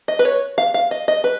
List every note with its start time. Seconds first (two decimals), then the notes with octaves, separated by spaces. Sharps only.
0.08 D#5
0.19 B4
0.25 C#5
0.58 F5
0.74 F5
0.91 D#5
1.08 D#5
1.24 B4